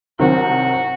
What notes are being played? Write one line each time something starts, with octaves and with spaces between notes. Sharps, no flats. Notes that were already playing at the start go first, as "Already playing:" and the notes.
C2 C3 D#3 F#3 C4 F#4